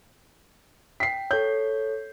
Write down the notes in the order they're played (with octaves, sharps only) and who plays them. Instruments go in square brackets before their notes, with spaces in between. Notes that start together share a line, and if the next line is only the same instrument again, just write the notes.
[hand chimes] G5 [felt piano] B6 C7
[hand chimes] A4 C#5 [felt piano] G6